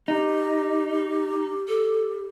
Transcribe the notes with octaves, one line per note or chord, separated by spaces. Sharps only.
D#4 G4
A4